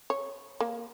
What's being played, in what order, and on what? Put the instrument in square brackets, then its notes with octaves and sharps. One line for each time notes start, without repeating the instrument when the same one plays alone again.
[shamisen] C#5
A#3